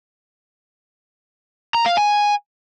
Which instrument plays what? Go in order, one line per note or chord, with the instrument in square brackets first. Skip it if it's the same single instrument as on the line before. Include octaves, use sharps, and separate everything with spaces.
[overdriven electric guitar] A#5
F5
G#5